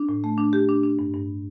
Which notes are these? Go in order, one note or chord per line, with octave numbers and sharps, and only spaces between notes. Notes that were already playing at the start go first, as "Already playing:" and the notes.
Already playing: D4
A2
A3
D4
G4
D4
D4
G2
G2